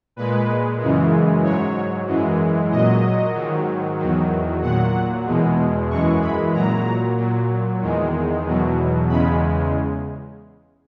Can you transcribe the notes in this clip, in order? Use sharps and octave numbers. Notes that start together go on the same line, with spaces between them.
A#2 G#3 B4
F#2 C#3 E3 G#3
G#2 F#3 C#5
F#2 E3 G#3
A#2 F#3 D#5
G#2 D#3 F#3
E2 D#3 F#3
A#2 F#3 F#5
E2 B2 G#3
F#2 E3 G#3 C#6
B5
A#2 F#3 A#5
A#2 F#3
E2 D#3 G#3
E2 B2 F#3
E2 C#3 G#3 B5